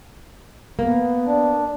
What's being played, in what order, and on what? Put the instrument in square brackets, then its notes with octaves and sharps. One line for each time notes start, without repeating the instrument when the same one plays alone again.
[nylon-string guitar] A#3 [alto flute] B3
[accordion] D4